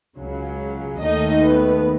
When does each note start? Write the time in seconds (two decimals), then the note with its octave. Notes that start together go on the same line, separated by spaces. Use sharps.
0.16 C#2 C#3 F#3
1.02 D#2 D#3 A3 D#4 D#5
1.45 B3 B4